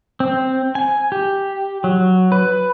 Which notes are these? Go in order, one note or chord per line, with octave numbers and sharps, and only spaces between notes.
C4
G#5
G4
F#3
B4